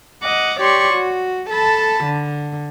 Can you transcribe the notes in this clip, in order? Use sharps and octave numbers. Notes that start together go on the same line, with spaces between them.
D#5 F#5 D6
G4 C#5 D5 C6 C#6
F#4
A4 A5 B5
D3